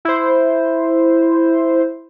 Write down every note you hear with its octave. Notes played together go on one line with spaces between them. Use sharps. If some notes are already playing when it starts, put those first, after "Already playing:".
E4 C5